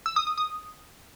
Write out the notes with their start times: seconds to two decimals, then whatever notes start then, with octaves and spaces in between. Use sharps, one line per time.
0.06 E6
0.16 D#6
0.27 D#6
0.38 D#6